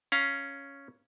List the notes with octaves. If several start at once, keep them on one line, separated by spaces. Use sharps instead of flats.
C#4 F5 A#5